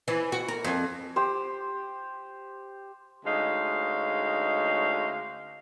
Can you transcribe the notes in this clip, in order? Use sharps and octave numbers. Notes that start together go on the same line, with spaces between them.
E3
F#4
A#4
F2
G4 C5
D2 G#3 C#4 D#4 F5